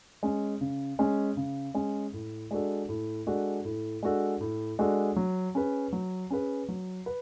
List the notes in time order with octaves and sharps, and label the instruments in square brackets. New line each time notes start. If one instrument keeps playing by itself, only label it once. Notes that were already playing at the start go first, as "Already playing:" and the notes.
[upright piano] G#3 C#4
C#3
G#3 C#4
C#3
G#3 C#4
A2
G#3 D4 F#4 A4
A2
G#3 D4 F#4 A4
A2
G#3 D4 F#4 A4
A2
G#3 D4 F#4 A4
F#3
C#4 G#4 B4
F#3
C#4 G#4 B4
F#3
B4